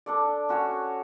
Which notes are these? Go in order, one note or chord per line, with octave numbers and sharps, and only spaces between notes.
D4 A4 D5
C#4 F#4 C#5